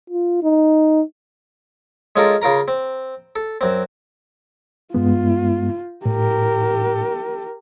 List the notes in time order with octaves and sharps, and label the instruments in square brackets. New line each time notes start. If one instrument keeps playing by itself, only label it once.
[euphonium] F4
D#4
[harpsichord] G#3 C#4 F4 A4 A#4
C#3 F4 A#4 A#5
C4
A4
F#2 C4
[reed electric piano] G2 G#3 B3 [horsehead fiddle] F4
[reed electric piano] A2 [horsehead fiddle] G4 A#4